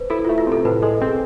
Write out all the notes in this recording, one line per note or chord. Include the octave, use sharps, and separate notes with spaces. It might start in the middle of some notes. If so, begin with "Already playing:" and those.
Already playing: B4 C5
E4 A4
F4
A3
F4
C3 A4
A2 B4
G#3 A4
C4 G#4